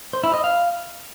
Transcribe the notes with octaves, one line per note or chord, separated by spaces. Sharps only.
C5
E4
D#5
F5